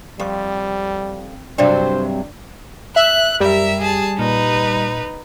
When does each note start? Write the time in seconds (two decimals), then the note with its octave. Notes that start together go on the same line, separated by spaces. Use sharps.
0.20 F2 G3 G4 C#6
1.58 G2 C3 F#3 D4 C5 D5 G5
2.96 E5 F#6
3.40 F#2 G3 A#4 E5
3.80 G#4 A5
4.19 A#2 D#4 B4